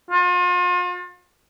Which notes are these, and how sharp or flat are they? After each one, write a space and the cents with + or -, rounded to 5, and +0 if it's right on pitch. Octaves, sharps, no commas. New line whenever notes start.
F4 +40